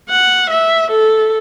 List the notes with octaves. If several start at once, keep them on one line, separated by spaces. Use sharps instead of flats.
F#5
E5
A4